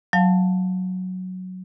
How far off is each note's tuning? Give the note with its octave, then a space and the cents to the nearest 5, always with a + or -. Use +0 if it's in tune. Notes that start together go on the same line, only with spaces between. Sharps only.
F#3 +0 F5 +0 A5 +0